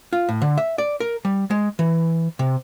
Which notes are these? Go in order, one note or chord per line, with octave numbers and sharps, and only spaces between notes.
F4
A2
D3
E5
D5
A#4
G3
G#3
E3
C3